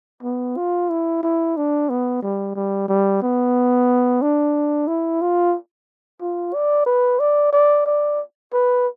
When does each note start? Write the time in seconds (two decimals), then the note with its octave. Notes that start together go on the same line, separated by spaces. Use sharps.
0.23 B3
0.57 F4
0.90 E4
1.23 E4
1.56 D4
1.89 B3
2.22 G3
2.55 G3
2.88 G3
3.22 B3
4.22 D4
4.87 E4
5.21 F4
6.20 F4
6.53 D5
6.86 B4
7.19 D5
7.53 D5
7.86 D5
8.53 B4